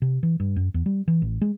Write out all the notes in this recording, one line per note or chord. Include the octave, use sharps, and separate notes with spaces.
C3
E3
G2
F#2
E2
G3
E3
A1
G#3